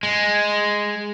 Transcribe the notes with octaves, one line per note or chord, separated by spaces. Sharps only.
G#3